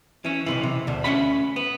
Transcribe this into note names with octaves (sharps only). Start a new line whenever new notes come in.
E3 C#4
B1 C3 E3
C3
D2 B2
A3 C#4 F#5 B5
B3